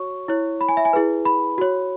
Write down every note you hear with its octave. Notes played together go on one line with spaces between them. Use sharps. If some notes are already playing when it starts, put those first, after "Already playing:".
Already playing: F#4 C#5 C#6
E4 C#5
B5
G#5
E5
G#5
E4 G#4 B4
B5
F#4 C#5